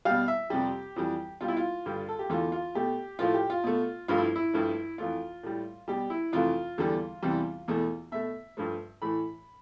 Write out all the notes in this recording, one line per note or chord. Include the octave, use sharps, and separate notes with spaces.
B2 G3 F5
E5
F2 C3 G3 G4
F2 E3 G3
B2 G3 F4
E4
F4
G2 D3 G3
A4
G4
E2 D3 A3 F4
F4
B2 A3 G4
A2 F3 A3 F4
G4
F4
B2 A3
G2 F3 A3 F4
E4
E4
G2 F3 A3
F2 E3 A3 F4
A2 G3
B2 G3 G4
E4
F2 C3 E3 A3 F4
E2 D3 G3
E2 C3 E3 G3
E2 B2 A3
B2 A3 E5
G2 F3 A3
A2 E3 A3 B5